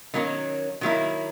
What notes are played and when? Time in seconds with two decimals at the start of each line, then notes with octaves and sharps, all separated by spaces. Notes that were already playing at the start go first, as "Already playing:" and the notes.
0.14 D#3 F#3 A#3 C#4
0.81 D#3 F#3 A#3 E4